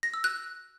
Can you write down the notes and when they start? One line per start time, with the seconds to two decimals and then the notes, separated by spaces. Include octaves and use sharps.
0.03 A#6
0.14 E6
0.24 F#6